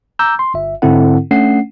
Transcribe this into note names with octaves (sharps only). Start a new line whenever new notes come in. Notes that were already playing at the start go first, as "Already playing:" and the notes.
A#5 D6 E6 G6
C6
G1 E5
G#2 D3 C4 E4 A4 F#5
A3 C#4 D4 F#5 C7